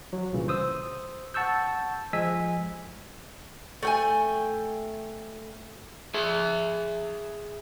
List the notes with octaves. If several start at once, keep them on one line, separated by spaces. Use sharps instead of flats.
F#3
C2 A#2 C#3 E3
C5 D#6 E6
F#5 A5 C#6 E6 G6
F3 G#3 D#5 G#5 E6 B6
A3 G5 G#5
G#4 E5